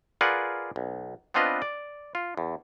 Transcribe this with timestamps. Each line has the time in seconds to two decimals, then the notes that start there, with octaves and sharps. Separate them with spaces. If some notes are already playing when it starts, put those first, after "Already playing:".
0.21 F4 G#4 A#4 B4 D5 F#5
0.76 B1
1.34 B3 C4 D4 F4 B4 D#5
1.62 D5
2.15 F4
2.37 E2